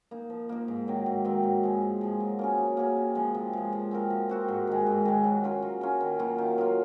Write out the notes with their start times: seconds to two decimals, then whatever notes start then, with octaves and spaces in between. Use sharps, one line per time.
0.11 A#3 D#4
0.30 F3
0.49 A#3 D#4
0.68 G#2
0.87 D#3 F#3 C4
1.06 G#2
1.25 D#3 F#3 C4
1.44 G#2
1.63 F3 G#3
1.82 G#2
2.01 F3 G#3
2.20 F#3
2.39 A#3 C#4 G#4
2.58 F#3
2.77 A#3 C#4 G#4
2.97 C3
3.15 F3 G#3
3.35 C3
3.53 F3 G#3
3.73 F3
3.91 C4 F#4 A#4
4.10 F3
4.29 C4 F#4 A#4
4.48 G#2
4.67 D#3 G#3
4.86 G#2
5.05 D#3 G#3
5.24 F#3
5.43 C#4 F4 A#4
5.62 F#3
5.81 C#4 F4 A#4
6.01 D#3
6.19 F#3 A#3 F4
6.38 D#3
6.58 F#3 A#3 F4